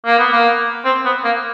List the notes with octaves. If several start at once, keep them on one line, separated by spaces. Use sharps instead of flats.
A#3
B3
A#3
C4
B3
A#3